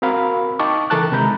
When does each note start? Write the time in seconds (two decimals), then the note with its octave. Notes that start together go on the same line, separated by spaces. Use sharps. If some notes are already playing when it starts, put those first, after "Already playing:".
0.02 C4 F#4 A#4 F5 B5
0.59 D#4 D#5 G5 A5 C#6 D6
0.90 C#3 E3 A4 A#4 A5 F#6
1.12 C3 D#3 G#3 A#5 B5 G6